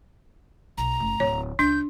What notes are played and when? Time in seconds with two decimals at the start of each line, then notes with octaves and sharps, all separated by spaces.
0.78 B1 A#5
1.00 F#1 A3
1.20 D1 C#5
1.59 C#2 D4 G6